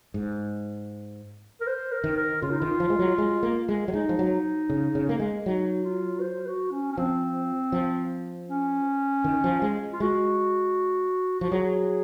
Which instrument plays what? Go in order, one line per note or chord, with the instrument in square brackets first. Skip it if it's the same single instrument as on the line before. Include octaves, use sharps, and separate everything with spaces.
[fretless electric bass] G#2
[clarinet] A#4
C5
A#4
[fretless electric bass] D#3
[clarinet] A#4
[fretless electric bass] C#3 [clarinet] F4
[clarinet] D#4
[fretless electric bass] D#3 [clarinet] F4
[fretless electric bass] F3
G#3
F#3
G#3
A#3
G#3
F#3
[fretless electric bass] G#3 [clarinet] D#4
[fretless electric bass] F3
F#3
C#3
C#3
A#3
G#3
[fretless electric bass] F#3 [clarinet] D#4
[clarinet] F4
C5
F#4
C#4
C#4
[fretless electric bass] F3 [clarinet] C4
[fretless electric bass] F3
[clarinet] C#4
[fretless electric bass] D#3
F3
G#3
[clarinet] F4
[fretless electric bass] G#3 [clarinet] F#4
[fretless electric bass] F3 [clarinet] F#4
[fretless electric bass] F#3 [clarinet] G#4